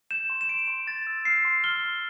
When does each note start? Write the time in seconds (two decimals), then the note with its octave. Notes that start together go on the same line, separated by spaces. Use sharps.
0.11 G6 E7
0.30 C6
0.41 E7
0.49 C6 D7
0.67 C6
0.87 C6 A6
1.07 E6
1.25 F6 C7
1.45 C6
1.64 F6 G7
1.83 C6